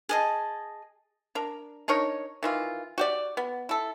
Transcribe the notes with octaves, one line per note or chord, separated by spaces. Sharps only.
G#4 D#5 A5
D4 A#4
D4 D#4 A#4 C#5
D#3 E3 F4
F#4 G4 D5
B3
E4 A4